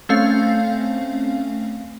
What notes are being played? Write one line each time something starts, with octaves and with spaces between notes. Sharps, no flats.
A3 C4 C#4 F5